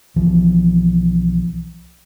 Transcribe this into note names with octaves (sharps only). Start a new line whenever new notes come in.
B1 E3 F3